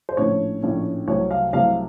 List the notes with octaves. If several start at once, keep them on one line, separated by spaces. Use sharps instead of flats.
C5
A#1 A2 A3 C#4 C#5
A#1 A2 A3 C#4
C2 C3 F#3 A3 C4 C#5
F5
C2 C3 F#3 A3 C4 F5